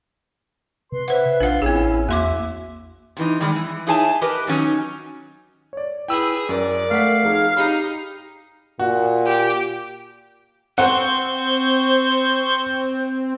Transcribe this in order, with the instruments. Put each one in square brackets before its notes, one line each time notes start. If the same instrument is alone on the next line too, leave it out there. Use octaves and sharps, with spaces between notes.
[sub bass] C3 [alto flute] B4 [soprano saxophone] C6
[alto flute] B4 [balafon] C5 F#5 [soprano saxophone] E5
[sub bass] A#1 [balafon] D4 F#5 [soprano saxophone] F4
[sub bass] A1 [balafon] C4 G#4 [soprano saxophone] C#4 [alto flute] E4
[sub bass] E2 [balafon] A#3 C6 D6 [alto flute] F#4 [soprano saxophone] E5
[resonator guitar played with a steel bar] C3 E3 D#4
D#3 G3 G#3
E3
D#4 E4 G#4 C#5 G#5 A5
G4 A#4 B4 D#5
D#3 F#3 C#4 D#4
[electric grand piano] C#5 D5
[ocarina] E4 [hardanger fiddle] G#4 B4 [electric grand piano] G5 E6
[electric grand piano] F#2 [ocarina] A#4 [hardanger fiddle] D5
[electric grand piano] A3 F#5 B6 [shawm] F5
[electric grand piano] F2 D#4 [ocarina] G#4
[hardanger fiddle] D#4 [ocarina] G4 [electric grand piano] B5
[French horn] A#2 [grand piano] F#4
[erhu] G4
[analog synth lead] C4 [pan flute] C5 [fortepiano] F#5 [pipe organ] C6 C#6